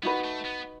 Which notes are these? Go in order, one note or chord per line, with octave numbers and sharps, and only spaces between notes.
B3 D#4 F#4 B4
A3
B3